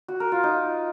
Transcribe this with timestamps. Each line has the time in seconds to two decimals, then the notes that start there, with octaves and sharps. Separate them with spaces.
0.08 F#4
0.20 A#4
0.32 F4
0.44 D#4